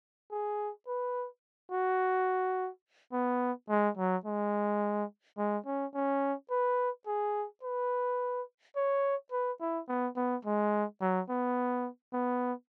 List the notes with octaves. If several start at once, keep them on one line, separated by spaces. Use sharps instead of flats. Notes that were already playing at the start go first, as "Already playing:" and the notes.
G#4
B4
F#4
B3
G#3
F#3
G#3
G#3
C#4
C#4
B4
G#4
B4
C#5
B4
E4
B3
B3
G#3
F#3
B3
B3